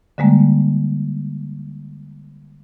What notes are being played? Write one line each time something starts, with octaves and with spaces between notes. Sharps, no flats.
D3 G3 G#3 A#3